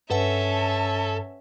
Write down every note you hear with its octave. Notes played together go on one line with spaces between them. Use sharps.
G2 C#4 A4 B4 E5 F#5 A5